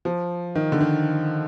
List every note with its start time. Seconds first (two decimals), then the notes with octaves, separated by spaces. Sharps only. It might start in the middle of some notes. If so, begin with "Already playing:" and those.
0.05 F3
0.55 D#3
0.72 D3
0.81 D#3